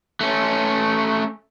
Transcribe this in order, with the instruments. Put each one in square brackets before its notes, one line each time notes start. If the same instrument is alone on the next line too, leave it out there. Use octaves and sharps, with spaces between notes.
[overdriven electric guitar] A3 C#4